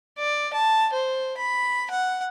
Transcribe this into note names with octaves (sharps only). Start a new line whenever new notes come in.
D5
A5
C5
B5
F#5